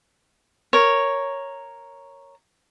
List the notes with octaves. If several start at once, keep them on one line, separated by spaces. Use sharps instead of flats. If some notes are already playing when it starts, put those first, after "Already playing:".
A#4 C#5